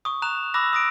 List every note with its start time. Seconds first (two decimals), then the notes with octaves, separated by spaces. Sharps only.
0.05 C#6 D#6
0.22 A#5 F#6 E7 F7
0.54 B5 D6 E6 F#6 A#6
0.73 D#6 A#6 D7